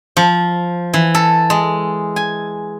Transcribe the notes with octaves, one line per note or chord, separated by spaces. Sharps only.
F3
E3
A4
G#3
G#5